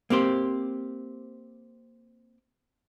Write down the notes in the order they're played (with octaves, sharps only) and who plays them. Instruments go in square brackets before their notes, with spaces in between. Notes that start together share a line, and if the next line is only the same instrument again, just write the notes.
[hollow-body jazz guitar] A#3 C4 G4 C5